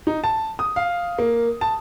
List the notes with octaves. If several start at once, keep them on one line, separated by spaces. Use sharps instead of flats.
D#4
A5
D#6
F5
A#3
A5